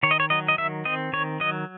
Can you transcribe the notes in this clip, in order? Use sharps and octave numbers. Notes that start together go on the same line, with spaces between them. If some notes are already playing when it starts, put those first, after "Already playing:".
D#3 C#5
D#5
C#5
F#3 D#5
D#5
D#3 E5
C4 D#5
D#3 C#5
F#3 D#5